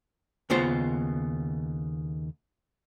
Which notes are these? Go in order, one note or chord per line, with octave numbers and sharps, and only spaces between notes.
D#2 C#3 B3 F4 C5